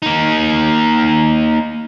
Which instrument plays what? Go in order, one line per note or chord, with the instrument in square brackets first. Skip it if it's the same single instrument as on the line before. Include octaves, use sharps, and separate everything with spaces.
[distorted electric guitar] A#3 D#4